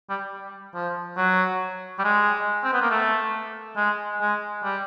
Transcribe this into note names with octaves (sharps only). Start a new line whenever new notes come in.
G3
F3
F#3
G3
G#3
C4
B3
A#3
A3
G#3
G#3
G3